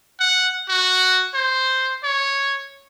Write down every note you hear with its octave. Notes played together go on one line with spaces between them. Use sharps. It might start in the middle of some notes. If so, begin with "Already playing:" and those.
F#5
F#4
C5
C#5